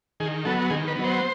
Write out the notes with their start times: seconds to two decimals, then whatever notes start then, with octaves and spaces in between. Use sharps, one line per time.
0.20 D#3 G#4
0.45 F#3 B3 A4
0.70 D#3 G#4
0.88 B4
0.96 F#3 B3
1.04 C5